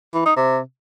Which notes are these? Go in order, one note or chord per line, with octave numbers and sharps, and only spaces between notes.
E3
D#4
C3